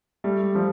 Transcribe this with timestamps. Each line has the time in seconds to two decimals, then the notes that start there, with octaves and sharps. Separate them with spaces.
0.24 G3 A3
0.55 F3 G3